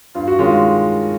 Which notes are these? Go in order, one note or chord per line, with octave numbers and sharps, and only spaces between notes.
G2 F4
F#4
D#3 G#3 C#4 F4